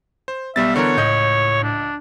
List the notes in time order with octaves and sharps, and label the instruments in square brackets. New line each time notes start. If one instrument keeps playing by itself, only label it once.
[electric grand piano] C5
[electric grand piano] B1 G3 A6 [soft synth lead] B3 [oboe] E5
[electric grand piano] D3 E3 A#4 [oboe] C#5
[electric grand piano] C#2 D#5 G6 [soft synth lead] A2
[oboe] D4